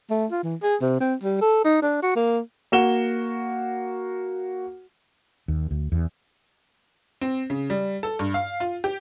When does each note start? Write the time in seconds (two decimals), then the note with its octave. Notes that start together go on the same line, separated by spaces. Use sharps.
0.10 A3
0.31 F4
0.43 E3
0.63 G#4
0.82 C3
1.00 C4
1.23 G3
1.41 A4
1.65 D#4
1.82 D4
2.03 F#4
2.16 A#3
2.72 A#3 F#4 E7 G7
5.48 D#2
5.71 D2
5.92 E2
7.21 C4
7.50 C#3
7.70 G3
8.03 A4
8.19 G2
8.34 F5
8.60 F4
8.84 G4